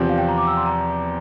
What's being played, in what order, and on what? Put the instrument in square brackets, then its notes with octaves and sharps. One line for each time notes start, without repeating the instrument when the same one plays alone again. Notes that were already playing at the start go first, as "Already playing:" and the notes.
Already playing: [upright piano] E2 C3 F3 C4
[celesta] F5
G5
A#5
D6
E6
C6
A#5